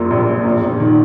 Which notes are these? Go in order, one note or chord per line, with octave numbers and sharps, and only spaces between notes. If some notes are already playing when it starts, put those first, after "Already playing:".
Already playing: A#1 F#2 A#2
A#1
A#2
A#1
A#1
D#3